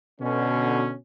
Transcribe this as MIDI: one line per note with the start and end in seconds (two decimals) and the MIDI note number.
0.21 0.94 47
0.21 0.94 50
0.21 0.94 61